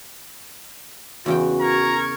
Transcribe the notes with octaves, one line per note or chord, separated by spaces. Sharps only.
E2 C#3 F#4 G5
A#4 A#5 C#6 G#6